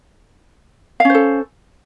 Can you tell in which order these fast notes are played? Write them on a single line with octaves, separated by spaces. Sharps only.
F5 C#4 C5 A4